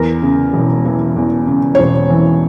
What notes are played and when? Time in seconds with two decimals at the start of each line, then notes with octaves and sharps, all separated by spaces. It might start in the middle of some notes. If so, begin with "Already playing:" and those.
Already playing: E2 A#4
0.22 C#3
0.53 E1
0.85 E3
1.16 E2
1.47 C#3
1.75 C#5
1.79 E1 C5
2.10 E3